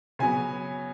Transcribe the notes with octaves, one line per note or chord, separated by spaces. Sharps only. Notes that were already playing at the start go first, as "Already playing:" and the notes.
C#3 F#3 B3 G#5